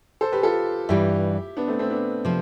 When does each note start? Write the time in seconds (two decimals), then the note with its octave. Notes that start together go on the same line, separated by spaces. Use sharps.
0.21 A4 C5
0.32 G4 B4
0.43 F4 A4
0.89 G2 E3 G3 E4 G4
1.57 B3 D4
1.67 A3 C4
1.79 A3 C4
1.90 B3 D4
2.25 C3 F3